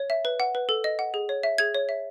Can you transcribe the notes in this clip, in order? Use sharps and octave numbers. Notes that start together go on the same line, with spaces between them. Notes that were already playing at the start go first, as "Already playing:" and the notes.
Already playing: C#5
E5
B4
F#5
B4
A4
D#5
F#5
G#4
C#5
E5
G#4 G#6
C#5
E5